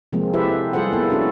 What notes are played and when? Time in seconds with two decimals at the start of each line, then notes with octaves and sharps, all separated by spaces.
0.12 C3 F3 G#3 A#3 C4
0.33 E4 G4 A4 B4 C5 E5
0.73 G3 F4 G#4 A4 C5 F#5
0.93 A#3 B3 E4 A4
1.09 C#4 D4 E4 F#4 A4